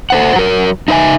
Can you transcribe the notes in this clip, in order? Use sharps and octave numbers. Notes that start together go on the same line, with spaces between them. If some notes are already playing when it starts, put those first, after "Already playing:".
A4 C5 F#5
F#3 A#4
D#4 E4 B4 E5 G#5